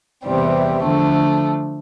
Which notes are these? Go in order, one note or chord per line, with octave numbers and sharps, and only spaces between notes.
E2 C3 E3 G3 C4
D3 F3 A3